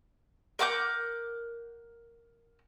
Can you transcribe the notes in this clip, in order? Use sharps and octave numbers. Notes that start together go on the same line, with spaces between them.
A#4 F#5 D6 G6